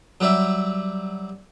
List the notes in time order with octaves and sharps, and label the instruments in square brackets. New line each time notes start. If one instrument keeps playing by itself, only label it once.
[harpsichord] F#3 G3 D5 E5